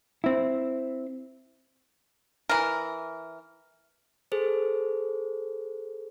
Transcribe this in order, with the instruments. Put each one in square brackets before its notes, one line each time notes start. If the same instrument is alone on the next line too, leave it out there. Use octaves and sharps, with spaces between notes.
[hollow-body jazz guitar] C4 E4
[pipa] E3 A#4
[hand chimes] G#4 A4 C5